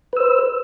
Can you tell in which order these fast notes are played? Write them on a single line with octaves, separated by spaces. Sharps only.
B4 E6 C5